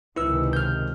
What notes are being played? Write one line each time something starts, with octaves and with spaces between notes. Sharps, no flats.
C#2 C3 D#3 E4 B4 E6
F6 G6